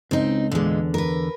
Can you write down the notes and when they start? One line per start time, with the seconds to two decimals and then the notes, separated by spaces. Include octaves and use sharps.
0.11 C#2 C4 D#4
0.52 E2 A#2 D3 G#3
0.94 A#4 B4